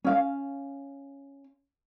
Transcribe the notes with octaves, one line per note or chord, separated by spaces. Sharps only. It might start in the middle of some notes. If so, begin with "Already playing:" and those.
C#4 F5